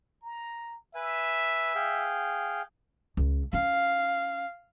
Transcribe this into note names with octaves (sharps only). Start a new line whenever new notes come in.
A#5
B4 E5 G#5
G#4 F5 G5
C#2
C#4 F5